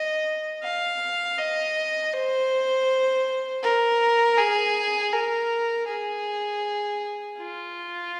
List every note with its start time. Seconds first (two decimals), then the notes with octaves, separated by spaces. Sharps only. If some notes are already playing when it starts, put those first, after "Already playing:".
Already playing: D#5
0.63 F5
1.38 D#5
2.13 C5
3.63 A#4
4.38 G#4
5.13 A#4
5.88 G#4
7.39 F4